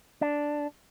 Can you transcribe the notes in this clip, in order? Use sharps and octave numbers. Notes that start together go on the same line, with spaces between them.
D4